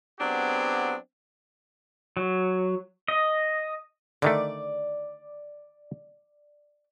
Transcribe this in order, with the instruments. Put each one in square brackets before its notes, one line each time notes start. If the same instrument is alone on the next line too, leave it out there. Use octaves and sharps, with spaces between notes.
[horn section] F#3 B3 C4 D4 G4 G#4
[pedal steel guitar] F#3
D#5
[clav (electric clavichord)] D3 D#3 A3 [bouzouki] D5